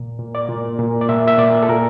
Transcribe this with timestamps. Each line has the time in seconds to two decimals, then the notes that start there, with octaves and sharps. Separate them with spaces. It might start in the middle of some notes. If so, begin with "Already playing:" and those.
Already playing: A#2
0.19 A#2
0.35 D5
0.49 A#2
0.79 A#2
1.01 D5
1.09 A#2 E5
1.27 E5
1.38 A#2 D5
1.63 A4
1.69 A#2 A#4